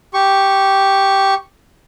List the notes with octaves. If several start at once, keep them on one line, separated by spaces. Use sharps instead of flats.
G4 C#6